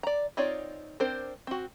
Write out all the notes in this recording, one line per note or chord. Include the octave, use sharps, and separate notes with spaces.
D5 A#5
C4 D#4 F4 C#5 D5
C4 D4 A#4 C5
C4 F#4